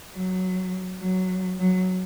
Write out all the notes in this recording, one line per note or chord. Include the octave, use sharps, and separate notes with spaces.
F#3
F#3
F#3